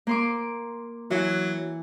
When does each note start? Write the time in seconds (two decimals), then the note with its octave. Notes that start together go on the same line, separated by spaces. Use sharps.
0.07 A#3 C6 D6
1.10 E3 F#3 E4